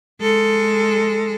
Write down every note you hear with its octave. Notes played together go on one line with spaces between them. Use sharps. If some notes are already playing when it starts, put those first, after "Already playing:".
G#3 A4